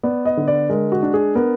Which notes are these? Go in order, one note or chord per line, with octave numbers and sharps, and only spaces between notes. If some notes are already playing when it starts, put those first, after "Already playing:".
B3 D5
D#5
D3
D5
G#3 A#4
F#4
D4
G#4
B3 A#4